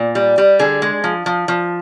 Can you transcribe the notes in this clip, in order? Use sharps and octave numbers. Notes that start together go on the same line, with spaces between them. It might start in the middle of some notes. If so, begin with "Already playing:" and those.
Already playing: A#2
G3
G3
D3 G#4
G#3
F3
F3
F3